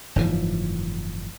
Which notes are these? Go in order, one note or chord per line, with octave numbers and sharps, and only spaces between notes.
F#1 G#2 E3 F3